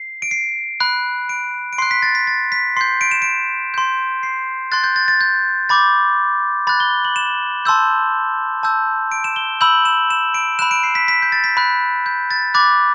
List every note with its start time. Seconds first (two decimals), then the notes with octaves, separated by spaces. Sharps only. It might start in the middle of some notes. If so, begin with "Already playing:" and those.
Already playing: C7
0.22 D7
0.31 C7
0.80 B5 F#6
1.29 D7
1.73 D7
1.78 C6 F#6 C7
1.91 B6
2.03 A6
2.15 B6
2.27 A6
2.52 B6
2.76 C6 G6 C7
3.01 D7
3.11 E7
3.22 D7
3.74 C6 G6
4.23 C7
4.72 C6 F#6 A6
4.84 G6
4.96 A6
5.08 A6
5.21 G6
5.69 B5 D6 G6 A6
6.67 B5 F#6 A6
6.80 G7
7.05 F#7
7.16 E7
7.65 A5 C6 E6 G6
8.63 A5 E6 G6
9.12 D7
9.24 E7
9.36 G7
9.61 B5 E6 G6 F#7
9.85 E7
10.10 E7
10.34 D7
10.59 B5 F#6 E7
10.71 D7
10.83 C7
10.95 B6
11.08 B6
11.22 G6
11.32 A6
11.44 B6
11.57 B5 F#6
12.06 G6
12.31 A6
12.54 B5 D6 F#6 A6